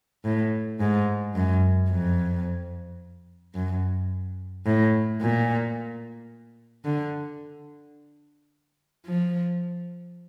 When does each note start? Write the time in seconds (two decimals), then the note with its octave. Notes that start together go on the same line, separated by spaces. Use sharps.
0.24 A2
0.80 G#2
1.35 F#2
1.90 F2
3.54 F#2
4.66 A2
5.21 A#2
6.85 D3
9.06 F3